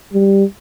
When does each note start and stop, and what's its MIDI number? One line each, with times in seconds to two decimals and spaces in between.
0.14 0.44 55